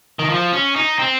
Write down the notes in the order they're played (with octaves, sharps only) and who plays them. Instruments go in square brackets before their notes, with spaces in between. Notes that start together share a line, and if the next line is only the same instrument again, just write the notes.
[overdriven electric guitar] D#3
F3
C#4
D#4
C4